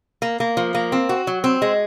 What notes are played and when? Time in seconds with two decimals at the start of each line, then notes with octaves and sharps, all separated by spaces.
0.22 A#3
0.40 A#3
0.57 F3
0.75 A#3
0.92 C4
1.09 F#4
1.27 F#3
1.44 C4
1.62 G#3